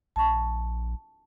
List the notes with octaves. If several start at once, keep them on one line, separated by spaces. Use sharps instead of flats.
A#1 A5 C#6